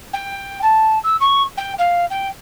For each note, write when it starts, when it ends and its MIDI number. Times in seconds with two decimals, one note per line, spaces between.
0.13 0.60 79
0.62 0.99 81
1.04 1.17 88
1.20 1.43 85
1.57 1.73 79
1.78 2.06 77
2.10 2.28 79